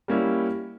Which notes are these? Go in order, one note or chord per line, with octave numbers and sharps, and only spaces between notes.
G3 A#3 C#4 E4